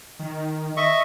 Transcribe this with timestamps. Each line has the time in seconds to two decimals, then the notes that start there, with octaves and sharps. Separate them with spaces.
0.19 D#3
0.77 D#5 E5 C#6